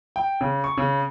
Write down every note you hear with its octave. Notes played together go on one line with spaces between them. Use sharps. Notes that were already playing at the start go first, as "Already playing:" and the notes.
G5
C#3
C#6
C#3